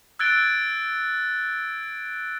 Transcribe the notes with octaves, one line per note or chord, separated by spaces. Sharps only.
E6 F#6 G#6 A6 D7 G7